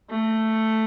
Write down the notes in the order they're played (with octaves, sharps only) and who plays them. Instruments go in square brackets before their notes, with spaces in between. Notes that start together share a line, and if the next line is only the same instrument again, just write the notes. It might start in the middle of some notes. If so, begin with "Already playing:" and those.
[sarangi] A3